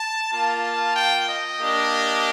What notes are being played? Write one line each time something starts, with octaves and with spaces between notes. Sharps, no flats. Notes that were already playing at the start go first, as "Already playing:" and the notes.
Already playing: A5
A#3 F4 A5
G5
D#5
A#3 D4 G4